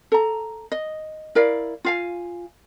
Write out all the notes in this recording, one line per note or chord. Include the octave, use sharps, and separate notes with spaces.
A4 A#5
D#5
E4 A#4 D5 F5
F4 F5 G#5